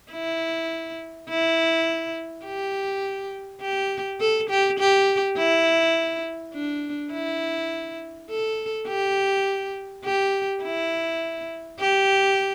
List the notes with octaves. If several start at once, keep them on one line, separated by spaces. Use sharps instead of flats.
E4
E4
G4
G4
A4
G4
G4
E4
D4
E4
A4
G4
G4
E4
G4